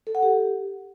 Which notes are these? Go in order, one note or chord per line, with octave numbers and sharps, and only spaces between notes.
A4
F#5
G4